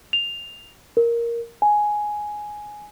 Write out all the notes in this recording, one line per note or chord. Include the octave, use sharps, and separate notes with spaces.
F7
A#4
G#5